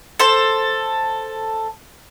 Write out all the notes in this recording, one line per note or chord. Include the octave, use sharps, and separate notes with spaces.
A4 C5